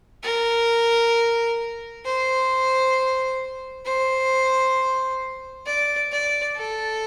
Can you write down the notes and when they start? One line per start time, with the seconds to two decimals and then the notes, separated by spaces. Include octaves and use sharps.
0.23 A#4
2.05 C5
3.85 C5
5.66 D5
6.11 D5
6.57 A4